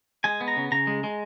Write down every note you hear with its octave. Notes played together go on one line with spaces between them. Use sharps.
G#3 G#5
B3
A#5
C#3
C#3 A#5
G#3
G#3